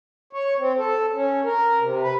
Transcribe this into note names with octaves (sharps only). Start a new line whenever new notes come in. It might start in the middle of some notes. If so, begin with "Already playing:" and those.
C#5
C4
A4
C#4
A#4
C3
B4